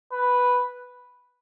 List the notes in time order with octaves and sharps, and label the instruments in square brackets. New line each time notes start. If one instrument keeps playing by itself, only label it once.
[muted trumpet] B4